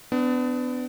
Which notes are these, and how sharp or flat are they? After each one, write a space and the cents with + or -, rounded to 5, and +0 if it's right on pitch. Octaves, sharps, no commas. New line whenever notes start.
B3 +30 D4 +0